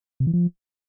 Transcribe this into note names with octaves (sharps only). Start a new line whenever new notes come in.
C3
E3
F3